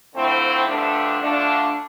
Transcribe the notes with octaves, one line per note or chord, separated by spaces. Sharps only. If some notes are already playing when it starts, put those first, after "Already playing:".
D3 F3 A3 C4 E4
G2 D3 F3 A3 D4
D3 A3 D4 F4